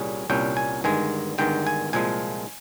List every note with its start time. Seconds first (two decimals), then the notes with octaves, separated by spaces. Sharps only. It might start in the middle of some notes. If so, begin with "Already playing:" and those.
Already playing: C2 A#2 G3 C#4 G#4
0.30 C2 A#2 G3 C#4 G5
0.57 G#5
0.84 G1 G2 D#3 G#3 G#5
1.38 G1 G2 D#3 G#3 G5
1.67 G#5
1.93 C2 A#2 F3 G#3 G#5